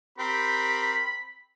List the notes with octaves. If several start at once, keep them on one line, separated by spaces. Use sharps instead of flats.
C4 G4 A#4 B5